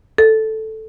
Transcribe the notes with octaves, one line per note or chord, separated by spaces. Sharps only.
A4